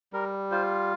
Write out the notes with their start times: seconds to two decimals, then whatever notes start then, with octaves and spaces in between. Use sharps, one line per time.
0.13 G3 A#4
0.51 F4 C5